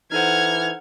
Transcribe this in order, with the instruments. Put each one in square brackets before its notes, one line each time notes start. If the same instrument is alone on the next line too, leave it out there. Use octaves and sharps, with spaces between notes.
[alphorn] E3 [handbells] D#4 A4 C5 [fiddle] F#5 F6 [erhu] G#6